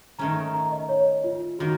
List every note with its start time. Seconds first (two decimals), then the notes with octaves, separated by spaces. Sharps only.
0.19 D#3 A3 C#4 A#5
0.54 A#5
0.72 D#5
0.89 C#5
1.24 F4
1.59 D#3 A#3 F#4